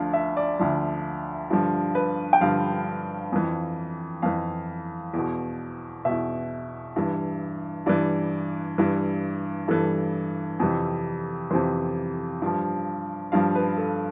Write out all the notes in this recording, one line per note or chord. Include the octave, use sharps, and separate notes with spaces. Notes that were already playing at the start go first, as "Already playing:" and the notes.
Already playing: D2 D3 F3 F5
E5
D5
D2 D3 F3
G2 D3 F3
B4
G5
G2 D3 F3 F5
F2 E3
F2 E3 F5
E2 B2
E2 B2 E5
G2 E3
G2 E3 D5
G2 E3
G2 E3 A4
F2 C3 E3
F2 C3 E3 C5
G2 F3
G2 F3 F5
B4
A4